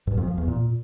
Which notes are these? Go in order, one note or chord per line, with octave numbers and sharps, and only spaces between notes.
G2
F2
F3
E2
A#2